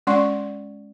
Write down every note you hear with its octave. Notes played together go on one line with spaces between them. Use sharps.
G#3 C#4 D5 F#5 C6 C#6